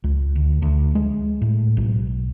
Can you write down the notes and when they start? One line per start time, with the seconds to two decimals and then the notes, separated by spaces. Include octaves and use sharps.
0.04 C#2
0.35 D2
0.62 D2
0.95 G#3
1.42 A2
1.77 B1